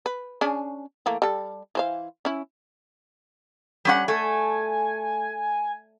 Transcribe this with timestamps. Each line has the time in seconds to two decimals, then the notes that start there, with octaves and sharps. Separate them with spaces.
0.06 B4
0.41 C#4 D4 G#4
1.06 E3 A3 A#3
1.22 G3 A4
1.75 E3 C5 F5
2.25 C#4 E4
3.85 G3 C#4 F#5
4.08 A3 G#5